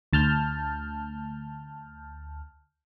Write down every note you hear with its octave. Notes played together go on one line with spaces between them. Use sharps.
D2 A5 F6 G6